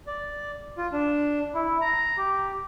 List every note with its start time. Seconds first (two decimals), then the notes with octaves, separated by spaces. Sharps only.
0.07 D5
0.77 F4
0.92 D4
1.54 E4
1.81 A#5
2.17 G4